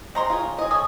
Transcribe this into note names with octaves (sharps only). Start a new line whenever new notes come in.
G#3 C4 A#5 C6
F4 G#4 C#5
G#4 D#5
A4 C#5 G#5 D#6